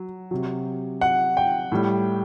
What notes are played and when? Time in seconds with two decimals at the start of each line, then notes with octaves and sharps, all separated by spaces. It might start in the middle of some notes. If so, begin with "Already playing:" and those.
Already playing: F#3
0.31 C3 F#3
1.01 F#5
1.37 G5
1.72 A2 G3